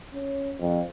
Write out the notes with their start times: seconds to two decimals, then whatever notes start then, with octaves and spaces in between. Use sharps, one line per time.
0.14 C#4
0.59 F2